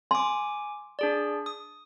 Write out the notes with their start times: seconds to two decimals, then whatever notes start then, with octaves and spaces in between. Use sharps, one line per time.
0.11 G#5 C6 D6
0.99 D4 G#4 D5
1.46 D#6